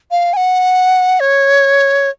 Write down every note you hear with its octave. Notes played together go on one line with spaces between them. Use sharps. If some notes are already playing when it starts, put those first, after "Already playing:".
F5
G#5
F#5
C#5